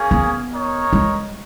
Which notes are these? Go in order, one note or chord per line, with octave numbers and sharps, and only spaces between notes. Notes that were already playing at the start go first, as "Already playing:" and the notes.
Already playing: A#3 C#4 G#4
B3
D#4 A#4 C#5
G#3